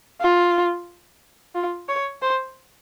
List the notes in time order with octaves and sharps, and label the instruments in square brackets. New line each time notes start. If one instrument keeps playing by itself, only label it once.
[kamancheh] F4
F4
C#5
C5